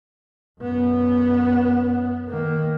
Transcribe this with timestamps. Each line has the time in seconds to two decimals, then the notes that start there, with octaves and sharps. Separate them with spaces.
0.61 F#2 B3
2.30 D#3 A#3